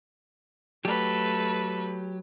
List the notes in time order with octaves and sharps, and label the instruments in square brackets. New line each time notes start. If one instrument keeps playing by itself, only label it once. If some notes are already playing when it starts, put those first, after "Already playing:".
[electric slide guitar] F#3 G4 [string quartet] A3 A4 B4